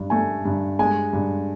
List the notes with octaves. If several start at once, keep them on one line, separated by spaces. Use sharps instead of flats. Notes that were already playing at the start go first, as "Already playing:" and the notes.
Already playing: G2
A3 G#5
G2
G#3 G#5
G2